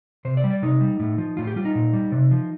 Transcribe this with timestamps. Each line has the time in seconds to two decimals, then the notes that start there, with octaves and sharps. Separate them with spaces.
0.25 C3 C5
0.37 D5
0.44 G3
0.51 D5
0.62 C3 D#4
0.81 G3
1.00 A2
1.18 F3
1.37 A2 F4
1.47 G4
1.56 G3 F4
1.65 D#4
1.75 A#2
1.93 G3
2.12 C3
2.31 F3